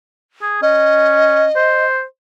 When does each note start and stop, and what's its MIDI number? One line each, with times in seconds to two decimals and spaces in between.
0.42 0.59 68
0.62 1.46 61
0.62 1.85 75
1.56 2.04 72